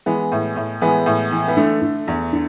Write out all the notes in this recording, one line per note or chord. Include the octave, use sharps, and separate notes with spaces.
E3 G#3 B3
A2
A2
E3 G#3 B3
A2
E3
B3
D3 A3
D3
E2
D3